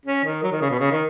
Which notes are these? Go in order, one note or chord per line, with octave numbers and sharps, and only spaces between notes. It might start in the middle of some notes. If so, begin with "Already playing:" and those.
C#4
D#3
F#3
D#3
C#3
B2
C#3
D#3